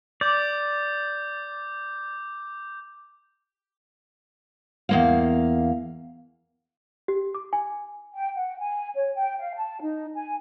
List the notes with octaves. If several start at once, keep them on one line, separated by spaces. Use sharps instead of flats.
D5 D6 G6
E2 A#3 F5
G4
D6
G#5
G5
F#5
G#5
C#5
G5
F5
A5
D#4
G#5